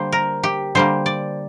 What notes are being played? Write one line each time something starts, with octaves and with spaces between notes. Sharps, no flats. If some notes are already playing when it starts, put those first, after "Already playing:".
Already playing: D3 G3 A#3 C5
A#4
G4
D3 G3 A#3 C5
D5